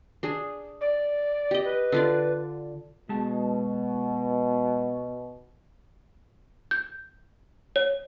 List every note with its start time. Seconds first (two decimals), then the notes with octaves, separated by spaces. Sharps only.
0.23 D4 G#4
0.81 D5
1.51 G4 D#5
1.64 B4
1.92 D3 F4 D5
3.09 B2 G#3 A5
6.71 G6
7.76 C#5